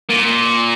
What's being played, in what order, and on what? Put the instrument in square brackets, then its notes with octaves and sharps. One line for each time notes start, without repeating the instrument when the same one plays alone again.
[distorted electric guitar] A#2